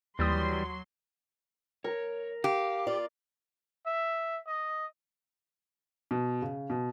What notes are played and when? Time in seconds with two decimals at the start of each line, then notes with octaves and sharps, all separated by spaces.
0.19 D#2 E3 F#3 G3 C6 D#6
1.84 A#4 C#5
2.44 G4 F5
2.87 F4 D5
3.86 E5
4.47 D#5
6.11 B2
6.42 C#3
6.70 B2